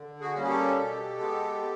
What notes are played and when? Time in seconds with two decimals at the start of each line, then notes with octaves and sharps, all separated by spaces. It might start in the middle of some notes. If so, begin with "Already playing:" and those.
Already playing: D3
0.21 F#4 G#4
0.35 G3 A#3 C#4
0.44 G#4
0.49 G4 A4
0.77 B2
1.19 G#3 B3